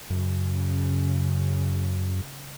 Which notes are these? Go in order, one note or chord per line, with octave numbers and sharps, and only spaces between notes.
F#2 C#3